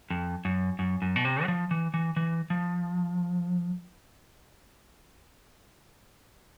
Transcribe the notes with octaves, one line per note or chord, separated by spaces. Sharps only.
F2
F#2
F#2
F#2
B2
C3
F#3
F3
E3
E3
E3
F3